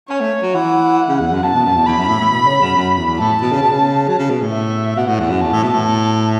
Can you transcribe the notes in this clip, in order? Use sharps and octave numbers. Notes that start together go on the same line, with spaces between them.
C#4 C#5
A3
F#3
E3 F#5
C#3
E2
F#2
F#2 A5
B2
F#2
E2
E2 B5
F#2
A2
A2
B2
C#3
F#2
F#2
E2
A2 A5
B2
C#3
B2
C#3
F#3
C#3
B2
A2
E5
B2 F#5
A2
E2
F#2
E2 A5
A2
B2
A2
A5